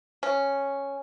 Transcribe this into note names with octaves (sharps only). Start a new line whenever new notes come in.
C#4